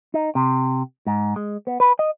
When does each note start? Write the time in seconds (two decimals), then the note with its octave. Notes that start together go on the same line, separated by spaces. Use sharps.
0.14 D#4
0.35 C3
1.07 G#2
1.36 G#3
1.67 B3
1.80 B4
1.99 D#5